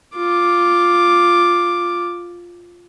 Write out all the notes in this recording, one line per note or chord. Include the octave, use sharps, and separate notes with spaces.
F4 D6